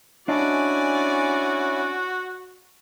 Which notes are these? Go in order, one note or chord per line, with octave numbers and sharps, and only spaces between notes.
C#4 D4 E4 F#4 D5 D#5 G#5 A5